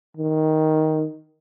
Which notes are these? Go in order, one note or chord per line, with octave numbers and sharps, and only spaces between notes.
D#3